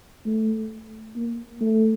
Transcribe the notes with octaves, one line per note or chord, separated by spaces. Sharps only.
A3
A#3
A3